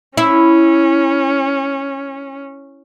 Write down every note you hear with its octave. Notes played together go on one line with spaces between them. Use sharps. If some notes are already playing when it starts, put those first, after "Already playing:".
C#4 E4